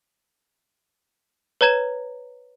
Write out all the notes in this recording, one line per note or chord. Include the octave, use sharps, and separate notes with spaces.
B4 C#5 A#5 G#6 E7